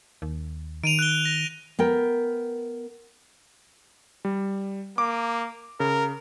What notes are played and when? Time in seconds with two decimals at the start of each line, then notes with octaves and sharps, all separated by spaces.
0.22 D#2
0.84 D#3 D7 D#7 F7
0.99 F#6 G7
1.25 A#6
1.79 B3 A#4 G5
4.25 G3
4.98 A#3 D6
5.80 C#3 A#4